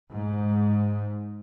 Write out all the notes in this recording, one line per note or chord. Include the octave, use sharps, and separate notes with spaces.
G#2